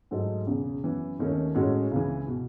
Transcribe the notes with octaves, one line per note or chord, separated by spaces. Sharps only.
G#2 F#3 A3 D#4 A4
E1 E2 C#3
F#2 E3 B3
D#2 D#3 A3 C#4
A2 G#3 C#4 F#4 A4
C#2 C#3 E3
B2